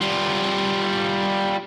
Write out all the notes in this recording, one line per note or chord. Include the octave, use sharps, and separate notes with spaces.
G3 F4